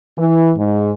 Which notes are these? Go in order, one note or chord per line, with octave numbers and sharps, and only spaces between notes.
E3
G#2